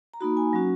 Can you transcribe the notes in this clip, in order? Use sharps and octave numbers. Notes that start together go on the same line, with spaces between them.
A#5
A#3 D#4 F#4 B5
G#5
F#3 C#4 F#4